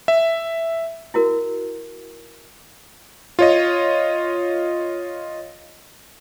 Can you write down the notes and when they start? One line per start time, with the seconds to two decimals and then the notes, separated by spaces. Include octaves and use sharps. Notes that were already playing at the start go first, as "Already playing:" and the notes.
0.08 E5
1.14 E4 F#4 A#4
3.39 F4 C#5 D#5